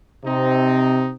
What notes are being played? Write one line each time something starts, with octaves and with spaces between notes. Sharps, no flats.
C3 C4 D#4